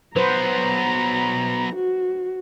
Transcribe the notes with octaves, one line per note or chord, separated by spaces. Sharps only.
F#3 B3 B4 C5 A#5
F#4